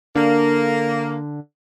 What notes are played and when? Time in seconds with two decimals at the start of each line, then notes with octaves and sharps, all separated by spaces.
0.15 D3 A#3